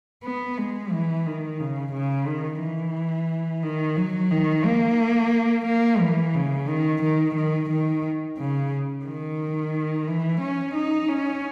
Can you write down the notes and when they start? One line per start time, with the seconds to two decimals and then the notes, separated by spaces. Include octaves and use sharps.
0.24 B3
0.58 G#3
0.91 E3
1.26 D#3
1.60 C#3
1.93 C#3
2.27 D#3
2.61 E3
3.63 D#3
3.96 F#3
4.31 D#3
4.65 A#3
5.66 A#3
6.00 E3
6.35 C#3
6.68 D#3
7.02 D#3
7.36 D#3
7.70 D#3
8.38 C#3
9.05 D#3
10.08 E3
10.41 C#4
10.75 D#4
11.09 C#4